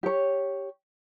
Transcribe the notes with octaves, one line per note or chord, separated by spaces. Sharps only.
G4 C#5